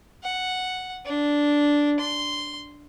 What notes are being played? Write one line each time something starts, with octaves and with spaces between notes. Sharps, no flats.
F#5
D4
C6